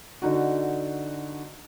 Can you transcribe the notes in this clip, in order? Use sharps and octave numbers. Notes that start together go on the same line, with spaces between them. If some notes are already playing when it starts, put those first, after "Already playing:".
D3 D#4 F#4